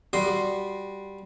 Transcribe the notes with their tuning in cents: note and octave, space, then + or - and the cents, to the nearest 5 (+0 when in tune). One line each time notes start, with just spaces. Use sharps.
G3 +0 F#4 +0 C6 +0